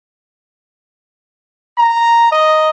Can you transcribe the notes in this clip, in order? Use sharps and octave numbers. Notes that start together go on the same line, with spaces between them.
A#5
D#5